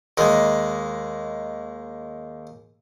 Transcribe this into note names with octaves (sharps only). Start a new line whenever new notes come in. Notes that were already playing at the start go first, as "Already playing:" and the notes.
D#2 G#3